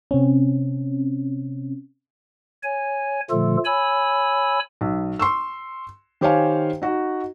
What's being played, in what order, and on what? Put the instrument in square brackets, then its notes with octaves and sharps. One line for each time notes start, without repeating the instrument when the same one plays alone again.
[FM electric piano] C3 C4 C#4
[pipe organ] C#5 G#5
A#2 D3 F3 A3 F4 A4
C#5 G#5 B5 E6
[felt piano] B1
C6 C#6 E6
D#3 G4 C5 C#5 F5 G#5
D#4 F#4